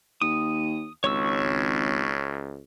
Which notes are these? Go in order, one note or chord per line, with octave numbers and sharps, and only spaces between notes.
D#2 D#6
G#1 C#2 C#5 C#6 E6